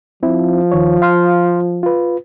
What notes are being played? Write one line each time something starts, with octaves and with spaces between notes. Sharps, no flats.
F3 C4 E4
D#2 D#3 C#5
F5 C6 F6
F4 B4